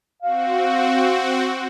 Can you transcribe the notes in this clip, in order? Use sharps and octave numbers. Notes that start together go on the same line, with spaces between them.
C4 F#4 F5